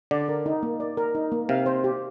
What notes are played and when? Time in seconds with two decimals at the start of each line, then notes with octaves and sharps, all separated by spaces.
0.11 D3 D5
0.29 A#4
0.46 D#4
0.63 A#3
0.80 D5
0.97 A#4
1.15 D#4
1.32 A#3
1.49 C3 F5
1.66 C5
1.84 G4